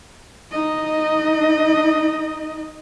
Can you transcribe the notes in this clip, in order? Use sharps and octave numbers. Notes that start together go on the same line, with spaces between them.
D#4 D#5